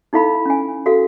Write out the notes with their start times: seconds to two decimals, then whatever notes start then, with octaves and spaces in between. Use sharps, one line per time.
0.13 D#4 E4 A4 F5 B5
0.46 C#4 G#5
0.86 F#4 A4 F5